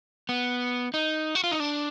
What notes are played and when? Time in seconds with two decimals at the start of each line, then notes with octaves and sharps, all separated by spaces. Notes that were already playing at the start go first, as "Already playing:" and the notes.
0.29 B3
0.94 D#4
1.35 F#4
1.44 F4
1.51 D#4
1.60 D4